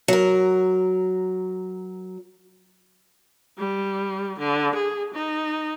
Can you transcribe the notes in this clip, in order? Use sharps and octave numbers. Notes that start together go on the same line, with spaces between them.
F#3 A#4
G3
D3
G#4
D#4